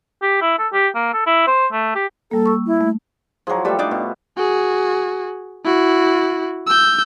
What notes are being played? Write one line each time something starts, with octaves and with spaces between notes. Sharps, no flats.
G4
E4
A4
G4
A#3
A4
E4
C5
A3
G4
G3 A#3 A4
C#6 E6
E4
A3
F3 F#3 F4 G#4
G3 A3 G4 A4 B4
D4 D#4 D5
B2
F#4 G#4
E4 F#4
E6 G6